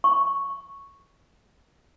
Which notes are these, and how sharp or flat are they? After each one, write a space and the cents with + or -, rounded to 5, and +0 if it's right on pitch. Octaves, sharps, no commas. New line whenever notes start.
C#6 -5